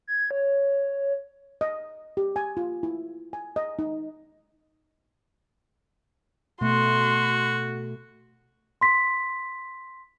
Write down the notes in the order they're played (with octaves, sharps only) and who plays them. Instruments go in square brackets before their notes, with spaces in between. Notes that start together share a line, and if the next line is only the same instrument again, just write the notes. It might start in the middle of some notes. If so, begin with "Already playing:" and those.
[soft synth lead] G#6
C#5
[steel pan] D#5
G4
G#5
F4
E4
G#5
D#5
D#4
[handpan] B2 A3 [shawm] F#4 [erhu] C6
[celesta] C6 B6